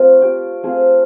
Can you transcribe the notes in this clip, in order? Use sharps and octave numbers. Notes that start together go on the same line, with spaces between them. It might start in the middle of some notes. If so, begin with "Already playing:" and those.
Already playing: A3 C4 F4
G4
A3 C4 F4 G#4